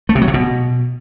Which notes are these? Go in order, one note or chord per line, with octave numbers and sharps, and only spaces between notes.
A3
C3
F#3
C3
B2